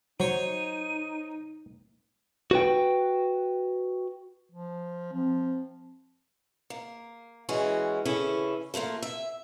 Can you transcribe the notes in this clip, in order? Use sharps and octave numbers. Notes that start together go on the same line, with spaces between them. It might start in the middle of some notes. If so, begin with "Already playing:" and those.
F#3 D#4 C5 C#5 D#7
F#4 B4 G5
F3
F3 C4
A#3
E3 G#3 C#4 F#4
C#3 E3 C#4 E4 A4
F3 A3 A#3 F4
E5